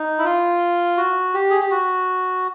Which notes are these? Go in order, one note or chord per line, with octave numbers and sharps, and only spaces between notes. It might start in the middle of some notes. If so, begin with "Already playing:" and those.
Already playing: D#4
E4
F4
F#4
G4
G#4
G4
F#4